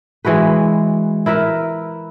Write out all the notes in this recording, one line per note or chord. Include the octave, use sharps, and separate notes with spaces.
E3 G#3 F#4 B4
E4 A#4 B4 E5